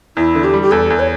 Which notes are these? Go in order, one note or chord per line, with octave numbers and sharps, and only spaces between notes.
E2 E4
D3
G4
G3
G4
E2 A4
E2
C#5